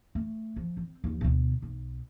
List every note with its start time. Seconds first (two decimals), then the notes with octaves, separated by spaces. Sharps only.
0.15 A3
0.56 F3
0.77 C4
1.04 D#2 F3
1.21 D2 B2
1.62 B1